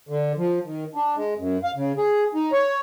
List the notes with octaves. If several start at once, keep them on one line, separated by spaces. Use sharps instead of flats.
D3
F3
D#3
D4
G#3
F#2
F5
C#3
G#4
D#4
C#5